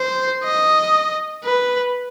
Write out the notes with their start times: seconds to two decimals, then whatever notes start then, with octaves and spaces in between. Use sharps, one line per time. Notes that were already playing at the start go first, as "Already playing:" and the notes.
Already playing: C5
0.44 D#5
1.44 B4